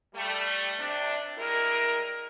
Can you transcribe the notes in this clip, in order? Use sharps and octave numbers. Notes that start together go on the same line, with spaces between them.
G3 A3
C3 D4
G3 G#3 E4 A#4